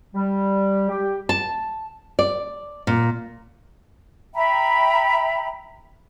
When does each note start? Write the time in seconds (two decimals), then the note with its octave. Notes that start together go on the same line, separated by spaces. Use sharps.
0.14 G3
0.89 G4
1.29 A5
2.19 D5
2.87 A#2
4.34 E5 G5 A#5 B5